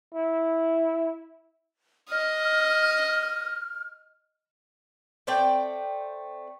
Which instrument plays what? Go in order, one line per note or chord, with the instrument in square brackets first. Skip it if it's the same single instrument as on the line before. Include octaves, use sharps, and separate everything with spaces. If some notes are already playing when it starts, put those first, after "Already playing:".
[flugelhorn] E4
[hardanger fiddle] D#5 [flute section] F6
[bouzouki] A3 C4 D5 G5